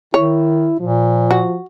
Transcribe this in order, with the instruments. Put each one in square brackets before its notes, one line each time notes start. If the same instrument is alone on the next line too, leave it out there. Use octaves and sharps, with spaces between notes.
[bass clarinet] D#3 [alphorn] E4 [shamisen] C#5
[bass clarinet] A#2 [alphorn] F3
[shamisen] F#4